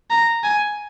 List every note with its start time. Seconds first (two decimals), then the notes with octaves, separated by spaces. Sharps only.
0.11 A#5
0.44 G#5